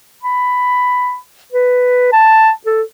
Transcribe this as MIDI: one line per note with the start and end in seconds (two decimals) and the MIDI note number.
0.23 1.16 83
1.52 2.07 71
2.12 2.51 81
2.66 2.82 69